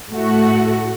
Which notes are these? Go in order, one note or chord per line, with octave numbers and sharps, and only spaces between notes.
A2 A3 F#4